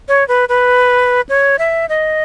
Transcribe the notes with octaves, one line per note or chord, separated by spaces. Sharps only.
C#5
B4
B4
C#5
E5
D#5